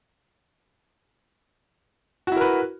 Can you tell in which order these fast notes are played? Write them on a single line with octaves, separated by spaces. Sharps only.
F#4 E4 A#4 B4